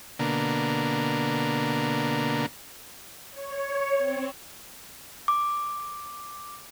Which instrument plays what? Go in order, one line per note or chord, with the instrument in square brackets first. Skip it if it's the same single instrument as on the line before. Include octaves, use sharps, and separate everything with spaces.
[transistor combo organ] B2 D3 A#3
[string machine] C#5
C4
[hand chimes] D6